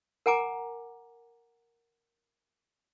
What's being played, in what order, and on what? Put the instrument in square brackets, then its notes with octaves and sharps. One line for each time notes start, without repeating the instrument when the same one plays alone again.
[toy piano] A#4 F#5 G#5 A#5 D6